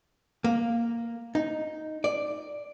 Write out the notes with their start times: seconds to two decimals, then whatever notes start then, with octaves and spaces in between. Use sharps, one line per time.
0.44 A#3
1.35 D#4
2.04 D5